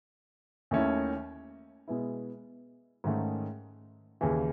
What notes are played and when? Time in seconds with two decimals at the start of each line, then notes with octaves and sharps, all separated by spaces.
0.71 D#2 D#3 A3 C#4 E4
1.88 B2 G#3 B3 E4
3.04 G#2 D#3 A3 C#4
4.21 D#2 C#3 E3